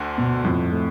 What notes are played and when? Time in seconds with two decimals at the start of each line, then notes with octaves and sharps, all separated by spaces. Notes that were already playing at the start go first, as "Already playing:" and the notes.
Already playing: D2 D3
0.18 B2
0.44 F2 A2
0.72 A3